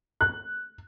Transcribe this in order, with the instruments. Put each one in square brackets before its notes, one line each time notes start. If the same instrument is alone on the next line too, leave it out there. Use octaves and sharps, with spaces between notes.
[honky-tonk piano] F#6